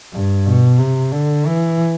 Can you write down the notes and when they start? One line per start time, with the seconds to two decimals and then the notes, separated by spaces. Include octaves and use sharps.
0.12 G2
0.46 B2
0.79 C3
1.12 D3
1.46 E3